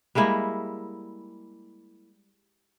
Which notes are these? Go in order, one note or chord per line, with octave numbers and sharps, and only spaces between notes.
G3 G#3 A#3 E4